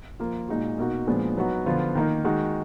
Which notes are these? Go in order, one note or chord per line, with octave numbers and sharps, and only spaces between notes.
F3 A#3 F4
A#2 G#3 D#4 F#4
B2 A#3 D#4 F#4
A#2 F3 G#3 B3 D4
F#3 B3 D#4 F#4
D3 F3 B3 F4
D#3 A#3 D#4
D#3 G#3 D#4 F#4